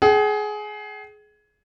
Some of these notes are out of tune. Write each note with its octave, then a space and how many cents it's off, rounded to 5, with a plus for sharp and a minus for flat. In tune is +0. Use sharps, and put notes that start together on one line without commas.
G#4 +20 G5 -40